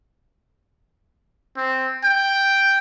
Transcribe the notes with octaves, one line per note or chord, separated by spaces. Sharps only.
C4
G5